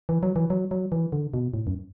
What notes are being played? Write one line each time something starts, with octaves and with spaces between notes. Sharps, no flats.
E3
F#3
E3
F#3
F#3
E3
D3
B2
A2
F#2